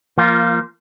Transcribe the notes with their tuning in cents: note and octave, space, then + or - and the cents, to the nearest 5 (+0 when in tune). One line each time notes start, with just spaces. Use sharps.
F3 -30 A#3 +0 F4 -5